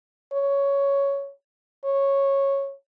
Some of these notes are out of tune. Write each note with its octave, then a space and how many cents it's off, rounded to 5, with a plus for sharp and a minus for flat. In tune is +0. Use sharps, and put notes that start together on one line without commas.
C#5 +5
C#5 -10